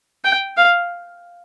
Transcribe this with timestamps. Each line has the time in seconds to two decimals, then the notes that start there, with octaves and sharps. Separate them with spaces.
0.24 G5
0.57 F5